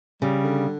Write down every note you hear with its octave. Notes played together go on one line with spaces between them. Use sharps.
C#3 G3
D3